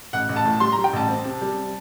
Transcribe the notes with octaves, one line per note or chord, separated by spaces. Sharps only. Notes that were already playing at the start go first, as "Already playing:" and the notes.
A1 F#5
A1
A5
A2
G3 C6
A#5
G3
G5
A1 A5
C4
C3
G3
C3